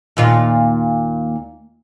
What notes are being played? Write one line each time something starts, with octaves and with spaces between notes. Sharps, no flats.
D#2 A#2 F4